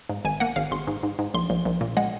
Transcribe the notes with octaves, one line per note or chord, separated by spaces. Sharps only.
G#2
G#1 G#5
A#3 F#5
G#1 F5
G#1 C6
G#2
G#2
G#2
A#1 C6
A#1
A#1
A#2
G#3 F#5